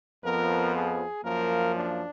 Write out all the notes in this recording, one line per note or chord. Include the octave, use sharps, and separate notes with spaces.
F2 F3 B3 A#4
G#4
F#2 F3 A#3 A#4
D4